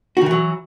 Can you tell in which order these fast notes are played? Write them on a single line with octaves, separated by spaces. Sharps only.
F#4 D#3 E3 F#3